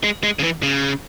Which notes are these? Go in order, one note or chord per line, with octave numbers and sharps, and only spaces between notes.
G#3
G#3
C#3
E3
C#3